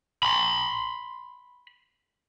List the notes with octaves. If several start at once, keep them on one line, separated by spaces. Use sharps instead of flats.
B5 C6